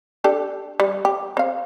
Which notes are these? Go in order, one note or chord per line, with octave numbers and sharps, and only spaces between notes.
D4 G4 A4
G3
G4
C4 F5